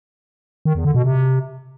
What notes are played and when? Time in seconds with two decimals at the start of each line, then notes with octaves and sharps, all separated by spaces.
0.65 D#3
0.75 E2
0.85 D3
0.95 B2
1.04 C3